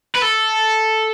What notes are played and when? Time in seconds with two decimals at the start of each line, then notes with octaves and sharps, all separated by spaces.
0.15 B4
0.22 A4